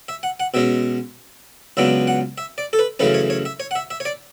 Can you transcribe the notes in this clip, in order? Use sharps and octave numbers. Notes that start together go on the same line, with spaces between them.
E5
F#5
F#5
B2 G#3 C#4 E5
C#2 C#3 F#3 B3 D4 E5
F#5
E5
D5
A4
B4
F#2 C#3 E3 A3 C#4 B4
C#5
C#5
E5
C#5
F#5
E5
E5
C#5
D5